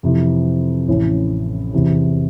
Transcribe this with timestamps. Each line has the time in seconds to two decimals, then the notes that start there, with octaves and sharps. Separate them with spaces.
0.03 F2 C3 E3
0.88 A1 A2 E3 A3 C#4
1.73 E2 C3 E3